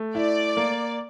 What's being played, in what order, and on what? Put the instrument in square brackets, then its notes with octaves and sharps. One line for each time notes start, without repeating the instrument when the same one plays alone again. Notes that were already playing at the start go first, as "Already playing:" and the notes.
Already playing: [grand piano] A3
[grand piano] E4 [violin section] D5
[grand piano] A#3